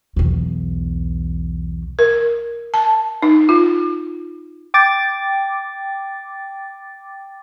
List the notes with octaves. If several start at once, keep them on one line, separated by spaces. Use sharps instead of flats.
B1 E2
A#4
A5
D#4
F4
G5 D6 A6